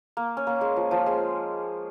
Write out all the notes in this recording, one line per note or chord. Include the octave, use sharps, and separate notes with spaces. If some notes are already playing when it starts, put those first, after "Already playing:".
A#3
C#4
A#3
G#3
F3
F3
G#3